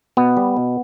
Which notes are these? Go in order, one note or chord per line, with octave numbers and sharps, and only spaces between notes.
B2 B3
G3
B2